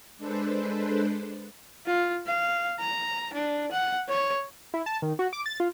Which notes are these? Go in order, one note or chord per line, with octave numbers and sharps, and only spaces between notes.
G#3 D4 A4 B4 C5
F4
F5
A#5
D4
F#5
C#5
E4
A5
D#3
F#4
D6
A6
F4